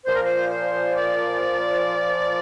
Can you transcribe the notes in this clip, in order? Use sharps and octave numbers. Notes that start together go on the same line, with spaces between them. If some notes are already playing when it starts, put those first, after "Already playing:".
A#2 F3 C5
A#4
C5
C5
D5